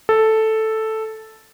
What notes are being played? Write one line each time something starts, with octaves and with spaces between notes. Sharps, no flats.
A4